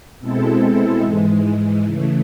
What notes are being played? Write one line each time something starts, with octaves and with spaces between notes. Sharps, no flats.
B2 G#3 C4 E4 A4
G#2 E3 G#3
C#3 E3 A3